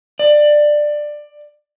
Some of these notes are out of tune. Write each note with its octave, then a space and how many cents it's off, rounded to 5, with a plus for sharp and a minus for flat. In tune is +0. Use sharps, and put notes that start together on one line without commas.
D5 +15